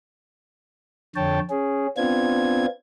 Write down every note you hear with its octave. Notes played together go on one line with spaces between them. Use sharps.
F2 D3 C#5 G5 A5
C#4 G#4
B3 C4 D4 F4 G#6